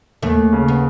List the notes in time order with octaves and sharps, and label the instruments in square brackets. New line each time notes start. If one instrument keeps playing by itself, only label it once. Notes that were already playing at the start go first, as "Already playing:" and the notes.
[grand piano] D#2 [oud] A3
[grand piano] C#3
[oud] B3